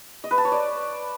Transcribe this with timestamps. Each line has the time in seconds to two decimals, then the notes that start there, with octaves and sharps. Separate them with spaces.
0.24 D#5
0.31 B4
0.38 A5
0.45 C#5
0.52 D5